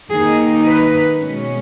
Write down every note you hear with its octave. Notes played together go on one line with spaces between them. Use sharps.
D#3 A#3 D#4 G#4
B4
B2 G#3 C#4